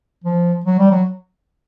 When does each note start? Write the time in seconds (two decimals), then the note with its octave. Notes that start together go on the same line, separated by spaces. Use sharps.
0.24 F3
0.66 F#3
0.78 G3
0.91 F#3